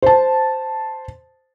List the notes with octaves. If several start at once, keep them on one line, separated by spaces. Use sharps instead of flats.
C5 A5